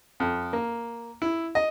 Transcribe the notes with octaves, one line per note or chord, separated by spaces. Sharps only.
F2
A#3
E4
D#5